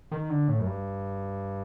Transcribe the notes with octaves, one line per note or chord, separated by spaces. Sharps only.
D#3
D3
A2
F#2
G2